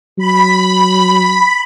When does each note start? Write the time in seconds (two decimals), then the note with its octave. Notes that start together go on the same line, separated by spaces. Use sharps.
0.18 F#3 B5